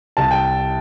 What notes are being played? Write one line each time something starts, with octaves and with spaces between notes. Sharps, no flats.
C2 A5
G5